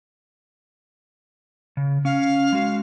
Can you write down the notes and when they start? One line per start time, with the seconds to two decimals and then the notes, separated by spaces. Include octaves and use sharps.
1.77 C#3
2.05 C#4 F5
2.52 G#3 F#4